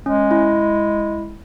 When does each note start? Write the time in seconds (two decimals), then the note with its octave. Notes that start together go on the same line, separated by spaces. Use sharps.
0.06 G#3 C#4
0.31 E4